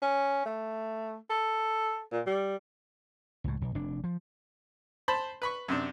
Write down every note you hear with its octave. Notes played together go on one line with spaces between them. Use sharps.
C#4
A3
A4
A#2
G3
C#2 A2
B1
F1 D4
F3
C5 A5 B5
B4 B5 C#6
F#2 C3 D4